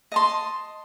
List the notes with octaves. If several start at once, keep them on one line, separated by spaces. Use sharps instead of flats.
D#5 A5 C6